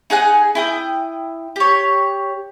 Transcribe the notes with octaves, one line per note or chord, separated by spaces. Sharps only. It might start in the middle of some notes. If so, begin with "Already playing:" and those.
D#4 G#4 F#5 G#5
E4 G5 D#6
G4 C#5